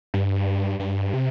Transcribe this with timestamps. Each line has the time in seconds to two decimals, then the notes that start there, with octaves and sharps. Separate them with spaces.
0.14 G2
0.79 G2
1.14 C3